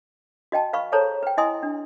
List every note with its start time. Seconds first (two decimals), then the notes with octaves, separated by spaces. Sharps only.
0.52 F#4 D#5 G5 A5
0.73 B4 F5 B5 C#6
0.92 G#4 A4 C5 C#5 A5 A#5
1.23 B4 G5
1.37 E4 D#5 G#5 C6 D#6
1.63 D4